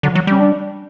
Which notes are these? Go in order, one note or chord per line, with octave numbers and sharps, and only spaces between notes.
D3 F#3
E3
F#3
G3 C#4
D4